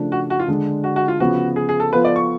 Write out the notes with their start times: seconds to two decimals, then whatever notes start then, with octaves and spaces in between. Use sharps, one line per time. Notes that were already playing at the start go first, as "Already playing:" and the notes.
Already playing: C#3 F3 A3 D4
0.12 F#4
0.30 F#4
0.39 F4
0.48 D3 G#3 D4
0.84 F#4
0.96 F#4
1.08 F4
1.20 C#3 F3 B3 F#4
1.56 G#4
1.69 G#4
1.80 A4
1.92 F3 B3 F4 A4 B4
2.05 D5
2.16 C#6